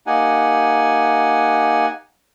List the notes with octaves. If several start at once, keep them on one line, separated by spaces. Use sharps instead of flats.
A#3 D#4 G4 F#5 G#5